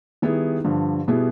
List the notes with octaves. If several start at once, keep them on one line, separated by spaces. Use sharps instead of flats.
D#3 G3 B3 E4 G#4
G2 D3 F3
B2 G3 B3 E4 G#4